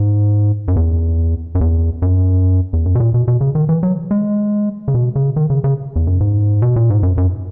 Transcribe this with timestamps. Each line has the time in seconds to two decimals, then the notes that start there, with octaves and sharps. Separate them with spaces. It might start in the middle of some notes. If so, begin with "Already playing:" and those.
Already playing: G#2
0.68 F#2
0.76 E2
1.55 F#2
1.61 E2
2.02 F#2
2.73 E2
2.86 F#2
2.95 B2
3.00 A#2
3.14 B2
3.28 B2
3.41 C#3
3.55 D#3
3.69 E3
3.83 F#3
4.11 G#3
4.88 C#3
4.94 B2
5.16 C#3
5.36 D#3
5.50 C#3
5.64 C#3
5.96 E2
6.07 F#2
6.20 G#2
6.62 B2
6.76 A#2
6.90 G#2
7.03 F#2
7.18 F#2